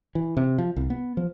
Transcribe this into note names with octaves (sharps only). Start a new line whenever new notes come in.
E3
C3
F3
C2
B3
F3